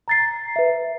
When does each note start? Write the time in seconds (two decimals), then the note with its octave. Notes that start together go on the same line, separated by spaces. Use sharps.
0.08 A#5 A6 C7
0.56 B4 E5